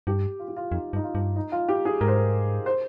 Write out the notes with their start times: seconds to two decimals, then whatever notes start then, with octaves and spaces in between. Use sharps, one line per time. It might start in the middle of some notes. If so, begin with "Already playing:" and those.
0.07 G2 G4
0.39 F4
0.48 G4
0.56 F4
0.71 F2 D#4
0.93 G2
0.96 D#4
1.04 F4
1.15 G2
1.36 D#4
1.52 F4
1.68 G4
1.85 G#4
2.01 G#2 A#4
2.08 C5
2.15 A#4
2.66 C5